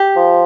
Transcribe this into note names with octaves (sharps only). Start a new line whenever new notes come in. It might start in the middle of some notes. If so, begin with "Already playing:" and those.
Already playing: G4
F3